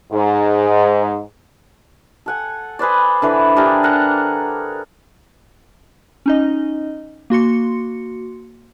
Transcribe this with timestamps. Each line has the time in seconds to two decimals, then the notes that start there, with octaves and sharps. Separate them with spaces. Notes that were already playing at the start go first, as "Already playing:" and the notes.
0.12 G#2
2.26 A4 F#5 G#5
2.79 G#4 B4 C5 D5
3.22 D3 E3 B4
3.56 D4 G4 G#4 A#4
3.83 A#4 F#5 A#5
6.26 C#4 D#4 D#5
7.30 A#3 F#4 C6 C#7